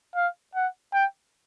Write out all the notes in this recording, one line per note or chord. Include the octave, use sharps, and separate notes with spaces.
F5
F#5
G5